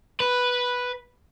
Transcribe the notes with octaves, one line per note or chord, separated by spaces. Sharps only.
B4